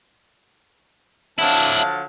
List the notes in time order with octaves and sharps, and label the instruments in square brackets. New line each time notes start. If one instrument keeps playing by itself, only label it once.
[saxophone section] D3 F3 F#3 [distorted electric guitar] D4 E4 [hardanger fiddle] F5 A5